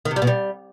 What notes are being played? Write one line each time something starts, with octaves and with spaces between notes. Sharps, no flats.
D#3
C3
G3
B2
G3